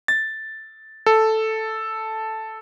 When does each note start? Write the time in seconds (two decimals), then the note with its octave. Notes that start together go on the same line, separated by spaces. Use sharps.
0.08 A6
1.06 A4